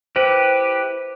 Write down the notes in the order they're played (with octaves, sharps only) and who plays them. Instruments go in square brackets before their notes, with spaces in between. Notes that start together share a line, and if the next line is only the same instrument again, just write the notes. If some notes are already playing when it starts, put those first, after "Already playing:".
[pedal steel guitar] E4 G4 B4 [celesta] C5